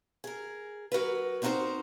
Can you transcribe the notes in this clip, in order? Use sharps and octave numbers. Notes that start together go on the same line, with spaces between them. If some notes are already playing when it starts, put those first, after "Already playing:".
G#4 A#4
F#3 F#4 A#4 B4
B3 C4 D#4 F#4 A#4 C5